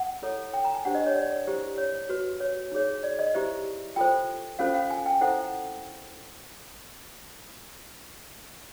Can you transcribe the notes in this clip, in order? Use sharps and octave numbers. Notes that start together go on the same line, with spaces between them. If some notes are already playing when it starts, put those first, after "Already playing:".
Already playing: F#5
E4 A4 C#5
G5
A#5
G#5
D4 G4 C5 F#5
D#5
C#5
D5
E4 G4 C5
C#5
F#4 B4
C#5
D#4 G#4 C#5
D5
D#5
E4 G4 C5 E5
F4 A4 C5 G5
C#4 F4 A4 C5 F5
F5
G#5
G5
E4 A4 C5 F#5